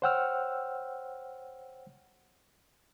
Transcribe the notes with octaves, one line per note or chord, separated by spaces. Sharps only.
C5 C#5 F#5 G5 E6 F6